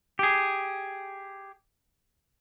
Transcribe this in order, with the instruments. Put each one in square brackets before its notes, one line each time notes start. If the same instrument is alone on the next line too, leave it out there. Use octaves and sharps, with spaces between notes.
[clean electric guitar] G4 G#4